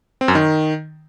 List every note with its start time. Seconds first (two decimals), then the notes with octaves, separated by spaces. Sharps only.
0.21 C4
0.28 F#2
0.35 D#3